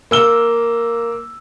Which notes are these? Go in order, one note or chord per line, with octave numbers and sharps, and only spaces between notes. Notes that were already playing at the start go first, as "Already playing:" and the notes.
A#3 E6 G7